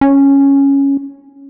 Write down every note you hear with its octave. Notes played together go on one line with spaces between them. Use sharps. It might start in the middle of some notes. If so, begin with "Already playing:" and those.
C#4